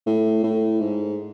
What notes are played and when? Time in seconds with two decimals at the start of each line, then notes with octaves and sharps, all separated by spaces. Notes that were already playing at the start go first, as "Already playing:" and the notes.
0.06 A2
0.44 A2
0.80 G#2